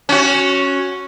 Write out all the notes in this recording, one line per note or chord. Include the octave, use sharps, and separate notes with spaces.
C#4 F#4